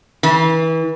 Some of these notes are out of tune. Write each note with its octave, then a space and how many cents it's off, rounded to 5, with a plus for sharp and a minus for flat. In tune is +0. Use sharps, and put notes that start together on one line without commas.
E3 -30